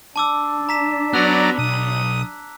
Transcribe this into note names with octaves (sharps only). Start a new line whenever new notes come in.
D4 A5 D6 E6
A#5 B6 E7
F#3 B3 D5 A#5 F#6
B1 D#6